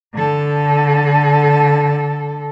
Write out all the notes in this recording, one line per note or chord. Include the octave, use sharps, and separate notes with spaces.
D3 A4